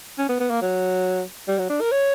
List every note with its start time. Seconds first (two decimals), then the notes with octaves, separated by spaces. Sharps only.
0.18 C#4
0.29 B3
0.40 B3
0.50 A#3
0.62 F#3
1.48 G3
1.59 F#3
1.70 D4
1.81 A#4
1.92 C#5